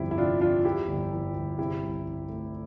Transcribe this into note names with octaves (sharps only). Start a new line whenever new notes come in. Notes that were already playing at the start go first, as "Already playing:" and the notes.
Already playing: G1 F2 E4 G4
E4
C3 D4 F4
E3 D4 F4
F2 E4 G4
G1
E3
G1
C3 E4 G4
C2
E3
A3